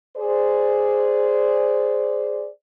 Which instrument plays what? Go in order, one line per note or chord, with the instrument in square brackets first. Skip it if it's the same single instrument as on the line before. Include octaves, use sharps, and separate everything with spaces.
[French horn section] G#4 C5 D5